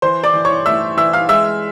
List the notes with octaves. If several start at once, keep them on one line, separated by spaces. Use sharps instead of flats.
E3 C5 C6
D5 D6
E3
C#5 C#6
A3 E5 E6
E3 E5 E6
F5 F6
G#3 E5 E6